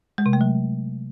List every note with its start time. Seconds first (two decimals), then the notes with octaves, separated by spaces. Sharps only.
0.18 G#3
0.26 C3
0.33 A3
0.41 F#3